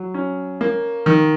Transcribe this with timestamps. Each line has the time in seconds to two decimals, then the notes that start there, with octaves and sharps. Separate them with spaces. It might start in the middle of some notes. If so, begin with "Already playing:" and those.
Already playing: F#3
0.14 C#4
0.61 A#3
1.06 D#3